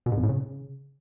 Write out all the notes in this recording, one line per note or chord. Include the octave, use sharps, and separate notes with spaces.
B2
G#2
F2
A2
C#3